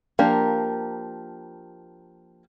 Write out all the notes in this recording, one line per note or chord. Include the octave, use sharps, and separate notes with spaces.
F3 A#3 D4 G4 A#4